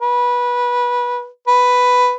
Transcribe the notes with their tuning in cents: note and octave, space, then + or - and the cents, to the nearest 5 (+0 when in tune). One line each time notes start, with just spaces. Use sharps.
B4 -20
B4 +5